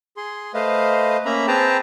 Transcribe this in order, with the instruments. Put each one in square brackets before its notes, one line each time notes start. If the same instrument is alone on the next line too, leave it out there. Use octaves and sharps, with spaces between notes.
[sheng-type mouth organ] G#4 C6
A3 B4 C5 D#5 F5
A#3 C#4 E5 A#5 B5
C4 G#4 B4 G5 A5 A#5